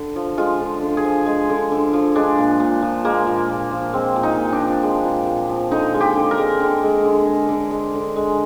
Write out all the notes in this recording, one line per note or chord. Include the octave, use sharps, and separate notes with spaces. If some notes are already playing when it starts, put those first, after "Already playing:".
Already playing: D3
F3
G#3 F4
D3
D3
G#4
F3
G#3
D3
D3
F3
G#3 D4
A#2
A#2
F3
G#3 A#3
A#2
A#2
F3
G#3 C4
A#2
D#4
A#2
D4
F3
G#3
A#2
A#2
F3
D3 D#4
G#3
G4
D3
A#4
G#3
D3
G#3
D3
G#3
D3
G#3
D3
G#3